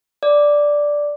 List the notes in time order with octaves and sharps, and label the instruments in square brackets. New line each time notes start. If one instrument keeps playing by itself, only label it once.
[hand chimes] D5